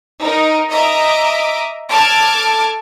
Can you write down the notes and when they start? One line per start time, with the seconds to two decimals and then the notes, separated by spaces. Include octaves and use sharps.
0.22 D#4 A#4
0.70 D#5 E5 A#5 D6
1.89 A4 A5 D6 F6 G#6